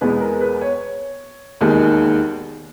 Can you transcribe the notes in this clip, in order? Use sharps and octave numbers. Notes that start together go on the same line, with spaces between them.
E2 B2 G#3 B3 B4
A#4
B4
C#5
E1 D#2 D#3 G#3